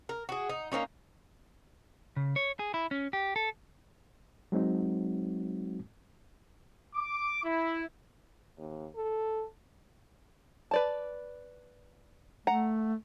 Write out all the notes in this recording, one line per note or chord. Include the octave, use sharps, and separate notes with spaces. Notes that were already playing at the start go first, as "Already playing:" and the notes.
A#4
F#4 G#4
D#4
A#3 B3 C#4 D#4
C#3
C#5
G#4
E4
C#4
G4
A4
F#3 G#3 C4 D#4 F#4
D6
E4
D#2
A4
B4 D5 A5
A3 F#5 A#5